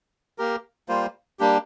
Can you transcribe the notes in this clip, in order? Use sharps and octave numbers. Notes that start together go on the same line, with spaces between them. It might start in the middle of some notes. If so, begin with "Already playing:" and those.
A#3 G4 A#4
G3 A#3 F4 C5
G3 A#3 D4 G4